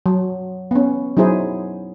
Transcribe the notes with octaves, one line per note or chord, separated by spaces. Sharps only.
F#3
B3 C#4
F#3 D#4 E4 G#4 C5